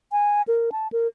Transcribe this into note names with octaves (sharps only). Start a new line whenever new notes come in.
G#5
A#4
A5
A#4